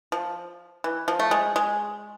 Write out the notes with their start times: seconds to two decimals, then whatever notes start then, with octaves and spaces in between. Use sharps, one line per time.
0.12 F3
0.84 E3
1.08 F3
1.19 A3
1.31 G#3
1.56 G#3